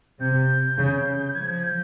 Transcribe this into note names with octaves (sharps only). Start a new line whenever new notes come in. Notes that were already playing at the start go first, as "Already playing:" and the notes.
C3 G6
C#3
F3 G#6
G6